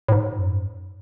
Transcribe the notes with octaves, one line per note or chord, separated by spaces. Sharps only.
A2
G#2
F#2